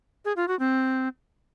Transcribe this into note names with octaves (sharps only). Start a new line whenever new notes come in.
G#4
F4
F#4
C4